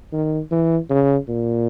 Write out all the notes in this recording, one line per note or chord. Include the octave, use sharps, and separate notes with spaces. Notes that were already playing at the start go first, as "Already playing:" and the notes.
D#3
E3
C#3
A#2